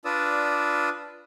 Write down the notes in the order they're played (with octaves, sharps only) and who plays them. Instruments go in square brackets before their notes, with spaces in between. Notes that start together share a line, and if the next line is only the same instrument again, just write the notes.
[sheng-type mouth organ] D4 F4 B4 D5 D#6 E6